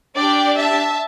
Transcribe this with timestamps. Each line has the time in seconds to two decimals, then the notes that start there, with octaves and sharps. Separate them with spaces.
0.17 D4 G4 D5 G5
0.58 E5 A5